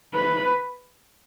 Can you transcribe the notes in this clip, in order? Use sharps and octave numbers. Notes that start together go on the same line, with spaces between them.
B4